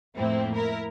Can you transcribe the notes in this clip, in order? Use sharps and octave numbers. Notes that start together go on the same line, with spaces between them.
F2 A2 A#3 C4 E4
E4 A#4